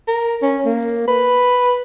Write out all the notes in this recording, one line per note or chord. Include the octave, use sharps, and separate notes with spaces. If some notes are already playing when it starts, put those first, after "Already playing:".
A#4
C#4
A#3
B4